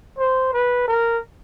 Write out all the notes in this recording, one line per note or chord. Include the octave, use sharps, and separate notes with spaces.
C5
B4
A#4